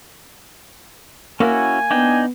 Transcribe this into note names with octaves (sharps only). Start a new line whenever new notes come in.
A#3 C#4 E4 F#4 G#5
B3 D4 D#4 G5